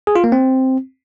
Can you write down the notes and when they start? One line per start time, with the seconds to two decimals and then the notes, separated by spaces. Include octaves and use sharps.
0.07 G#4
0.16 F4
0.24 A#3
0.32 C4